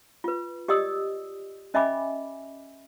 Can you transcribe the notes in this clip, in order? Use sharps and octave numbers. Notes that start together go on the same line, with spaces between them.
F4 B4
G4 D5 D#5 D#6 E6
C#4 D#5 E5 G#5 B5 D6